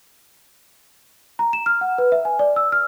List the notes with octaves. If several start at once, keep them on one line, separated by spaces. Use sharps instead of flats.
A#5
E7
F6
F#5
B4
E5
G#5
D5
E6
F6